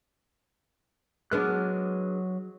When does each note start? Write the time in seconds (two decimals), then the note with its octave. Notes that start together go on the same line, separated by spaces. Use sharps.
1.31 F#3 G#3 B3 D4 F6 F#6